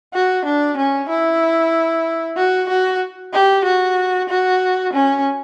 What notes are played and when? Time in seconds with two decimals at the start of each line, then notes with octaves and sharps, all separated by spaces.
0.14 F#4
0.45 D4
0.77 C#4
1.09 E4
2.37 F#4
2.69 F#4
3.34 G4
3.65 F#4
4.29 F#4
4.93 C#4